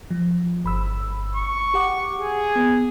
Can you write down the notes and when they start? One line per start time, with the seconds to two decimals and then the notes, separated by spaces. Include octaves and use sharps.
0.11 F3
0.64 G1 B5 E6
1.36 C#6
1.74 G4 F#5 D6
2.19 G#4
2.56 B3